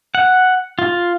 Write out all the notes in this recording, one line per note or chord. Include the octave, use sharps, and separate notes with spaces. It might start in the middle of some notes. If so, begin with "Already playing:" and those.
F#5
F4